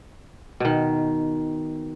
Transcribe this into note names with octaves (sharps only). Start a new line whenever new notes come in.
B2 D#3